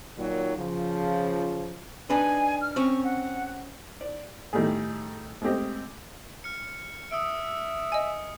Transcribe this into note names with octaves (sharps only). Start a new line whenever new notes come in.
A#2 D#3 F#3
C#3 F3
D4 D#4 B4 G#5
F6
C4 C#4 C#6
F#5
D5
A2 D#3 G3 A3 G#4
G#3 A3 C4 G4 D#5
F6 C#7
E5 D#6 E6 D7
D#5 G#5